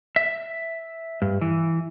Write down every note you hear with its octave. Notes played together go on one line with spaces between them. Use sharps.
E5
G2
E3